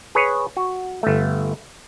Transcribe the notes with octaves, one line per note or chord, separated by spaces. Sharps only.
G#4 B4 C#5
F#4
G1 A3